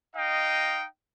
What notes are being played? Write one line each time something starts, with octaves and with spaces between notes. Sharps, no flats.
D#4 D#5 F5 G5